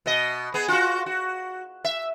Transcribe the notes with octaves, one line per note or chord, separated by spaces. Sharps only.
B2 D#5
B3 G#4
F4 F#4
F#4
E5